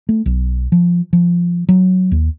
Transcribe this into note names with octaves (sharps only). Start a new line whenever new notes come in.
A3
B1
F3
F3
F#3
D#2